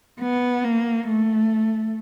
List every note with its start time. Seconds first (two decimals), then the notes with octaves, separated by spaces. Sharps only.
0.21 B3
0.65 A#3
1.07 A3